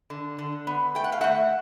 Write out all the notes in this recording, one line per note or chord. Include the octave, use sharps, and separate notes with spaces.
D3
D3
B3
A3 G5
F#5
F5
A3 E5 F#5